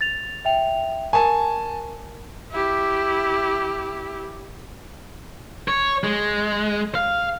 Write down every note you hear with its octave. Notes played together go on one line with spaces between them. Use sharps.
A6 F7
E5 G5 F7
A#4 G#5 A5 C#6
E4 G4
C#5
G#3
F5